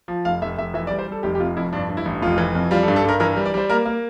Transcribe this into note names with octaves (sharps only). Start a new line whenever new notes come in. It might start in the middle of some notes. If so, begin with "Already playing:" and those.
F3
F1 F5
F1 E5
F1 E5
E3 E5
D5
G3
C5
G3 A4
F1 G4
G4
C3 F4
F2 E4
G2 D4
G2
E4
A1
F1 F4
E3
F2
G3 F4
A4
G2
A4
G2 A#4
E3 A#4
A#4
G3
D5
G3 C5
A#3 A#4
A#3